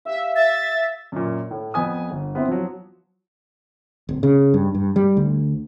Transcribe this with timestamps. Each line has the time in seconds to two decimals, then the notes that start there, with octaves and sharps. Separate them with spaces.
0.05 G4 E5 F5
0.36 E5 A6
1.12 F#2 A#2
1.51 A2
1.74 F2 B3 G#5 D#6
2.11 G1
2.35 B3 C4 E4
2.48 F3 F#3
4.09 D1
4.23 C#3
4.54 G2
4.75 G2
4.96 G3
5.17 D2